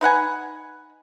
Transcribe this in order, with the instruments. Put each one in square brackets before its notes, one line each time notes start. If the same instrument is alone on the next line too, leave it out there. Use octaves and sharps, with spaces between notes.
[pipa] D#4 B4 F#5 G#5